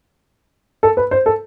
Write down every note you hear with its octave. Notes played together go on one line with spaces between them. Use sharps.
A4
B4
C5
A4